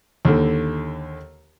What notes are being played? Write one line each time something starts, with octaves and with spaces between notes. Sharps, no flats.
D#2 D3